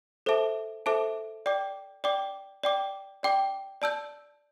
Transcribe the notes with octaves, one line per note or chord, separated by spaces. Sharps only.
A4 C5 E5 A5 D6
A4 C5 E5 A5 D6
D5 G5 D6
D5 G5 D6
D5 G5 D6
D5 G5 D6
D5 A5 E6 G6